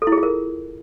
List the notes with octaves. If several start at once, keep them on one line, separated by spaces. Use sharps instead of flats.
A4
E4
G#4
F4
A#4